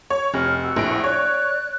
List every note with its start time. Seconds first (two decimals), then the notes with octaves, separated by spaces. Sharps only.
0.10 C#5
0.34 F1 F6
0.63 F#4 F#5 E6
0.76 A#1 A2 D7
1.04 C#5 D5 F#6